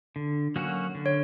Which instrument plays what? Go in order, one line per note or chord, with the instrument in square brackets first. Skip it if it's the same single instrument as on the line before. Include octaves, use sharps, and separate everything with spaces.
[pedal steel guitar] D3
F#3 A#3 C#4 F#4
D3
[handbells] C#5